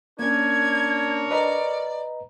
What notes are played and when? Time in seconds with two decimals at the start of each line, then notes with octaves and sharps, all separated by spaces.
0.19 A#3 C#4 D4 A#4 C#5 G#6
1.31 B4 D5 D#5 A#5